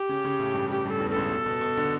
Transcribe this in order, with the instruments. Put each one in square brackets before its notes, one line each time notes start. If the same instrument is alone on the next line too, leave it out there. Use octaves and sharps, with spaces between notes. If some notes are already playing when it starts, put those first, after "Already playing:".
Already playing: [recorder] G4
[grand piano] C#3 C#4
C#3 C#4
A2 A3
G2 G3
[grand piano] G2 G3 [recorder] G4
[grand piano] G2 G3 [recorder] A4
[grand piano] E2 E3
[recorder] A4
[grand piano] C#2 C#3
B2
B2
B2
D3